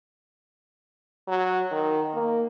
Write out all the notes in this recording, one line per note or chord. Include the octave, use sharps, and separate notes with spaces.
F#3
D#3
A#3